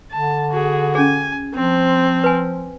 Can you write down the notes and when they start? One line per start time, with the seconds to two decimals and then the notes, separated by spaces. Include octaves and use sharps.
0.12 D3 A5
0.51 F#4 G#4
0.95 C#4 G#4 G#5
1.55 F3 C4
2.24 B4 G#5